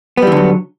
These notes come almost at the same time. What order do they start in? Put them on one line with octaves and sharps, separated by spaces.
B3 G3 E3 D3 F#3